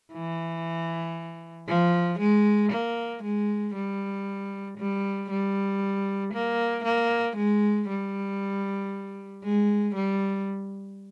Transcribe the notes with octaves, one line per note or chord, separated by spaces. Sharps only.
E3
F3
G#3
A#3
G#3
G3
G3
G3
A#3
A#3
G#3
G3
G#3
G3